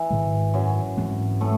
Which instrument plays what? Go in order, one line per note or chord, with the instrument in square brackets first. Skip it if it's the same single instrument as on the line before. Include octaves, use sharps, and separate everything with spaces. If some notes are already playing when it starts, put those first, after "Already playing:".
Already playing: [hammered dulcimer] E3
[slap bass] G#2 D#3 G#3
[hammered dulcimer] F#2 F#3
[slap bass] G#2 E3 G#3 C4
[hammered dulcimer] A2 A3